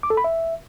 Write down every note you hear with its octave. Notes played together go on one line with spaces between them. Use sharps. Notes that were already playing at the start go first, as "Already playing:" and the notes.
D6
A4
B5
E5